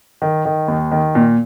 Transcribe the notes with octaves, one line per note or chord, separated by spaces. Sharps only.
D#3
D#3
D#2
D#3
A#2